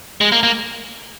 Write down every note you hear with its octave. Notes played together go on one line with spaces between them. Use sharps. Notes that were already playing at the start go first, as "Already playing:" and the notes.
G#3
A#3
A#3